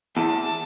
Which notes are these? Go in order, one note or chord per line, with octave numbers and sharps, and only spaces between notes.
E2 A5